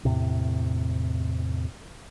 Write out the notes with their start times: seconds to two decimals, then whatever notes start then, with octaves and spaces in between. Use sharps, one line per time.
0.05 E2 A2 C3